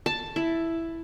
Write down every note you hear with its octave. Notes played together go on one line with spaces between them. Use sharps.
A5
E4